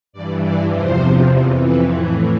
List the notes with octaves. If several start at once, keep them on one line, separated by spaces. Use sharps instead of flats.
G2 E3 D5
D5
E2 C3 F3 C5
F2 E3
B4
A2 E3 E4